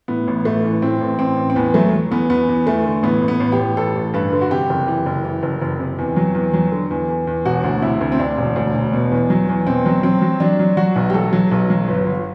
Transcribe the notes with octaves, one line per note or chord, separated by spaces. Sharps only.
A2 B3
A1
A1 A3
E3
A2 C4
A1
A1 C4
A1
C4
E2 B3
F#3 A3
F#3
E2 B3
E2 B3
E2
E2 A3
D3
A1 B3
A1
B3
A1
G4
A1
A1 A4
A1
G2 B4
D3
F#4
C3 G4
F#1
E3
F#1
E3
F#1
F#1
C3
E2
F#3
E2
F#3
D3
E2
E2
E2
E1 F#4
D2
C3 E4
D2
C4
D2 D4
E1
D2
E1
B2
E2
F#3
E2
B2 C4
F#3
F#3 C4
F#3
F#3 D4
F#3
F#3 F#4
B1
G4
F#3 A4
F#3
B1
F#3
G1
G1